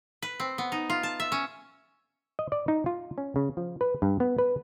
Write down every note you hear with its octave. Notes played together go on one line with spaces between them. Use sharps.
B4
C4
B3
D#4
F4
A5
E5
C#4
D#5
D5
D#4
F4
C#4
C#3
F3
B4
G2
B3
B4